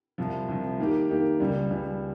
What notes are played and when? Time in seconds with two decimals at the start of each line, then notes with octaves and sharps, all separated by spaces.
0.18 C2 C3 F3
0.48 C2 C3 F3
0.79 D#3 A#3 D#4 G4
1.09 D#3 A#3 D#4 G4
1.40 C#2 C#3 G3
1.70 C#2 C#3 G3